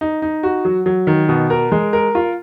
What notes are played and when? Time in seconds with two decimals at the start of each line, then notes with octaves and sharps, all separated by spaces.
0.01 D#4
0.22 D#4
0.43 F#4
0.65 F#3
0.86 F#3
1.07 D#3
1.29 B2
1.50 A#4
1.72 G#3
1.93 A#4
2.15 F4